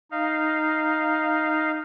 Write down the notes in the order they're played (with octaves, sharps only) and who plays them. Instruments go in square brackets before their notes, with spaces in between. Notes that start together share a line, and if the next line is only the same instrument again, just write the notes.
[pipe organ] D#4 F5